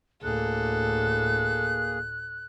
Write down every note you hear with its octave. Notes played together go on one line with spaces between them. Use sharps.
D2 A2 A#3 G#4 A4 F#6